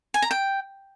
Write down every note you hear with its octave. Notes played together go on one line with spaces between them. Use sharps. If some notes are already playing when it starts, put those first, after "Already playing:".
G#5
A#5
G5